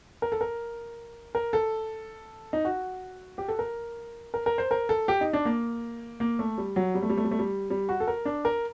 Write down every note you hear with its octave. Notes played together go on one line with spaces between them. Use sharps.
A#4
A4
A#4
A#4
A4
D#4
F#4
G4
A4
A#4
A#4
A#4
C5
A#4
A4
G4
D#4
D4
A#3
A#3
A3
G3
F#3
G3
A3
G3
A3
G3
A3
G3
G3
F#4
A4
A#4
D4
A#4